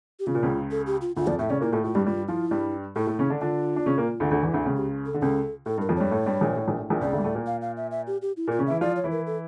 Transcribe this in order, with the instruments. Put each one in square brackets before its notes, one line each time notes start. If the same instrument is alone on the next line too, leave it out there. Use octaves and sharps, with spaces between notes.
[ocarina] G4
[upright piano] C#3 [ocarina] F4
[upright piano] A#2
C#2 C#3
[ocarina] A4
G4
F4
[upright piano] D2 D3 [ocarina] F4
[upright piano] F2 F3 [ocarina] D5
[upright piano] A2 A3 [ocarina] E5
[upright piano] C#3 C#4 [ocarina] D5
[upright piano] A#2 A#3 [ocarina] E4
[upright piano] A2 A3 [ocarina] F4
[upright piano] A2 A3 [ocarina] F4
[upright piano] G2 G3 [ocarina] G4
[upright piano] G2 G3 [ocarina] F4
[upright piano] F3 F4 [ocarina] E4
[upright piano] G2 G3
[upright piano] A2 A3 [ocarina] E4
[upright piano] A2 A3
C#3 C#4
D3 D4
[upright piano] D3 D4 [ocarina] F4
[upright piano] D4
C#3 C#4
A#2 A#3
D2 D3
D2 D3
E2 E3
D2 D3
C#2 C#3
[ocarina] G4
A4
[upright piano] D3
[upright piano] C#2 C#3 [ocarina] A4
[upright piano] A2 [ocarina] A4
[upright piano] G2
[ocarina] A#4
[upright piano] F2 F3
[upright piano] G2 G3 [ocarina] C#5
[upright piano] A2 A3
G2 G3
A#1 A#2
A2
A#1 A#2
A2
A#1 A#2
[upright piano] C#2 C#3 [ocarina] D5
[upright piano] D2 D3
G3
A2 A3
A#2 A#3
[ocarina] F5
F5
E5
E5
G4
G4
E4
[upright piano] A#2 A#3
[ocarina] F4
[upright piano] C#3 C#4
[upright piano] E3 E4 [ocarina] E5
[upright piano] F3 F4 [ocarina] D5
[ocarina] C#5
[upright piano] E3 E4
[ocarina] A#4
A4